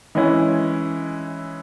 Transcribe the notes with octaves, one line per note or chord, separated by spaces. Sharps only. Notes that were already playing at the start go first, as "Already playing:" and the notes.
E3 G#3 C#4 E4